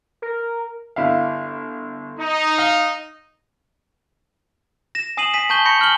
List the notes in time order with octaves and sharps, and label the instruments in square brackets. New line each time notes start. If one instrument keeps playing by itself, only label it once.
[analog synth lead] A#4
[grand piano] G1 E4 F5
[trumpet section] D#4
[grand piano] F5
[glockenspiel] A#6 E7
G#5 D#6 C7 D#7 E7 F#7
G#5 B6 D#7
G#5 A5 C#6 G6 G7
B5 C#6 G6 A#6 C#7
G#5 F6 F#7 G7